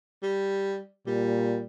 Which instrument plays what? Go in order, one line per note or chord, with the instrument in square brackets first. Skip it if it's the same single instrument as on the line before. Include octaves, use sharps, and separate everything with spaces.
[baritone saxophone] G3
[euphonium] A#2 [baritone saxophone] G3